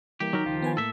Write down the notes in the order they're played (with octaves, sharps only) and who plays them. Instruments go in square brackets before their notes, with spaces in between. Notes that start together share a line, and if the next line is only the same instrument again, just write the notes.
[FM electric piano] E3 G3 A#3 [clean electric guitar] G4
[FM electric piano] D#3 [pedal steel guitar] F#3 A#4 [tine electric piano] D#4
[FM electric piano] C#2 [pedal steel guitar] D#3 F3 F4
[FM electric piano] B3 B4 G#5
[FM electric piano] A2 A#3 [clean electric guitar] A4 E5